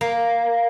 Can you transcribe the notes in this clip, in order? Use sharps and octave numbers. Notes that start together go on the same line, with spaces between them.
A#3